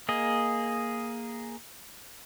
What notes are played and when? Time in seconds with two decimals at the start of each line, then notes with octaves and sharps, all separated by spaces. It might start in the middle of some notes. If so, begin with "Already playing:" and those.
0.09 A#3 G#4 D#5